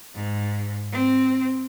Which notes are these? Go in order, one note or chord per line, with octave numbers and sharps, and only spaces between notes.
G#2
C4